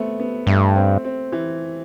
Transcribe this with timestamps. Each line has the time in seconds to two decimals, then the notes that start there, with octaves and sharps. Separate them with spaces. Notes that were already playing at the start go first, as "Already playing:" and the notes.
Already playing: A3 B3 C4
0.20 B3
0.47 G2 A3
0.76 C4
1.05 C4
1.32 E3